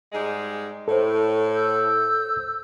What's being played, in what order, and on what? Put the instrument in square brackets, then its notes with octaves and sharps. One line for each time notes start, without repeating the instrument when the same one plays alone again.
[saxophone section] G#2 G3 G#3
[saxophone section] A2 [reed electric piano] A4 C5
[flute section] E6 G6